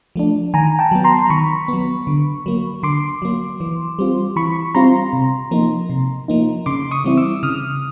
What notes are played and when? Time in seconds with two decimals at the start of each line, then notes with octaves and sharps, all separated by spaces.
0.16 F3 A3 D4
0.54 D#3 G#5 A#5
0.79 G5 A5
0.92 F#3 B3
1.04 A#5 C6
1.30 D#3 B5 C#6
1.68 F#3 B3
2.07 D3
2.46 F#3 A#3
2.83 D3 C6 D6
3.22 F#3 A#3
3.60 E3
3.99 G3 C4 F4
4.36 E3 B5 C#6
4.75 G3 C4 F4 A#5 C6
5.13 C3
5.51 F3 A#3 D#4
5.90 C3
6.28 F3 A#3 D#4
6.66 C#3 C6 D6
6.91 C#6 D#6
7.04 E3 G3 C4 E4
7.17 D6 E6
7.43 C#3 D#6 F6